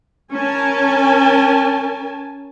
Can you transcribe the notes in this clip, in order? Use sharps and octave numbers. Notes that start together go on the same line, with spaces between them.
C#4 A#4 G#5 A5